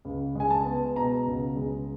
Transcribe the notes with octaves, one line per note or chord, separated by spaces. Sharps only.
C#2
G#3 G#5
A5
B3
B2 A#5
C#2
G#3